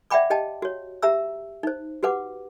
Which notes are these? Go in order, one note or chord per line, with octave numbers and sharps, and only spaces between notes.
D5 E5 F#5 G5 B5 D6
G4 D#5 G5 A5
F#4 C#5
G4 E5 A#5 E6
D#4 C5
F#4 G4 B4 F#5 D6